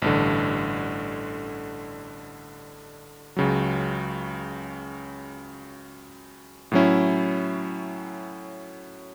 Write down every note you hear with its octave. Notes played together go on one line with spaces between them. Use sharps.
A1 G2 D3
C#2 C#3 F#3
A2 F#3 C#4 E4